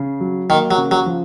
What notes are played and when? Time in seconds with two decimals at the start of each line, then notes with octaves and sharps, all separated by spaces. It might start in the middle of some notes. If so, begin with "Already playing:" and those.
Already playing: C#3
0.21 F#3
0.50 D#3 A#3
0.71 F#3
0.78 C#3
0.91 F#3
1.06 F3